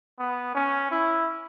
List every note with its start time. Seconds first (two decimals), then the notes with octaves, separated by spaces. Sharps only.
0.19 B3
0.55 C#4
0.91 E4